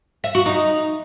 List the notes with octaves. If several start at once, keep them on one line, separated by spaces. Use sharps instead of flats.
E5
F#4
D#4